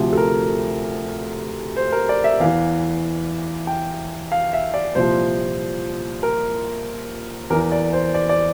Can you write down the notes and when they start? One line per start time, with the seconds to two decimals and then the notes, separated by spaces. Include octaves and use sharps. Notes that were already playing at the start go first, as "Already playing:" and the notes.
Already playing: D2 C3 F3
0.13 A4
0.17 A#4
1.76 C5
1.92 A#4
2.09 D5
2.24 E5
2.40 E2 E3 F5
3.67 G5
4.32 F5
4.53 E5
4.74 D5
4.95 C2 A#2 F3 C5
6.23 A#4
7.50 E2 A#4
7.54 E3
7.72 D5
7.93 C5
8.14 D5
8.29 D5